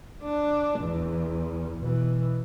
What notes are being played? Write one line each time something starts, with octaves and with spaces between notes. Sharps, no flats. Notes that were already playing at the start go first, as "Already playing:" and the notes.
D4
E2
B2 E3